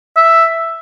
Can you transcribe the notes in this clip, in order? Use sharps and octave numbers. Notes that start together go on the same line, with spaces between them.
E5